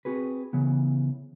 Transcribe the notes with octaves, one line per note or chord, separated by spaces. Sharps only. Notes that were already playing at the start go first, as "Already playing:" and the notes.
C4 F#4 G#4 B4
C#3 E3 B3